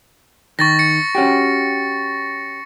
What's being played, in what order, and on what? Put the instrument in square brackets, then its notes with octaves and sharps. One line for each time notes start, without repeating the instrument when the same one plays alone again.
[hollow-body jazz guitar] D#3 [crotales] C#6 A6 A#6
[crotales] C#7
[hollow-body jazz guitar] C#4 F#4 G4